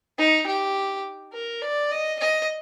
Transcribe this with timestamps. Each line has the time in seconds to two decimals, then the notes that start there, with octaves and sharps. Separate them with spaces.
0.18 D#4
0.47 G4
1.34 A#4
1.62 D5
1.92 D#5
2.20 D#5